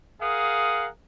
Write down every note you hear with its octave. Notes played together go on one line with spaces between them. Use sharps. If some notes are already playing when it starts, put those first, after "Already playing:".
G#4 A#4 F5 F#5 D#6